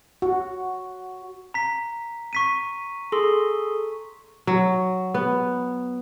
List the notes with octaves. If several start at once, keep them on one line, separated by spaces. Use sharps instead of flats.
F#4
A#5 B6
C#6 B6 D#7
G#4 A4 C6
F#3
B3